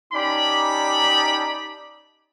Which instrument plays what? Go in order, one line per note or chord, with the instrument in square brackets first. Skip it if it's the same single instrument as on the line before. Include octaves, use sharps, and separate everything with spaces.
[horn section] C#4 D#4 G4 D5 A5 B5